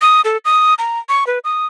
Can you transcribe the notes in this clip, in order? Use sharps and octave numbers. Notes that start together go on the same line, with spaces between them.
D#6
A4
D#6
A#5
C#6
B4
D#6